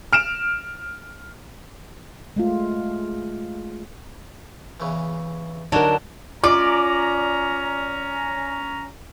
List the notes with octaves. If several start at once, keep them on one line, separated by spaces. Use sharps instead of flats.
F6 D7 E7
G#3 A3 F4
E2 C#3 E3
D3 F#3 D#4 A#4 A5
C#4 F4 D5 A#5 D6